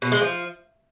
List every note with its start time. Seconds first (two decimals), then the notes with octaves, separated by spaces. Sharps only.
0.02 B2
0.12 G#3
0.22 F3